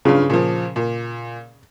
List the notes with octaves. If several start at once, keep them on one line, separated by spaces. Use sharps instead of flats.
G2 C#3 F4
A#2 F3
A#2